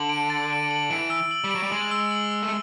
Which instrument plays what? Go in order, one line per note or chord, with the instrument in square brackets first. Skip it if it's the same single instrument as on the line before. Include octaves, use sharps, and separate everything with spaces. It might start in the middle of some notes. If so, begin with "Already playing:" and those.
Already playing: [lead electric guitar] D3 [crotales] F#7
[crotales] D7
A6
D7
F#7
[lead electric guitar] E3 [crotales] D7
[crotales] E6
F#7
[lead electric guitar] G3
[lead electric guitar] F#3 [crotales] D7
[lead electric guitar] G3
[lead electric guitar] G#3 [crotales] F#7
[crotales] E6
F#7
E6
[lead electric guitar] A3